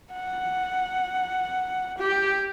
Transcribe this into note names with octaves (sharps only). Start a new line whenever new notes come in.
F#5
G4